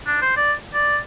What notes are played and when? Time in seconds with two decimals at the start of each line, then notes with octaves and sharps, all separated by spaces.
0.07 D4
0.22 C5
0.37 D5
0.74 D5